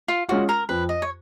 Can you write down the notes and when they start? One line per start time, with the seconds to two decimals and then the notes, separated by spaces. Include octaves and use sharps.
0.08 F4
0.29 G#3 C#4 F4 F#4
0.49 A#4
0.69 F2 B4
0.89 D#5
1.02 C#5